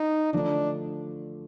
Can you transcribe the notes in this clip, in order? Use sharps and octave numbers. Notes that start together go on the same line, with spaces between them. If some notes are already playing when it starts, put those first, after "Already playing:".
Already playing: D#4
D3 F3 A3 D4